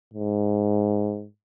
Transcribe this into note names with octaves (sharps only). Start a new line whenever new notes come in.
G#2